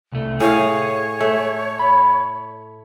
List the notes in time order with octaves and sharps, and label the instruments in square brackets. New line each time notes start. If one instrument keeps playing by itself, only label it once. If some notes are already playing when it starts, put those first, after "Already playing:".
[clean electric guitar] C2 A3
[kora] A2 F5 [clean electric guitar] G#4 [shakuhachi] C#5
[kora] A3
[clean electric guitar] B5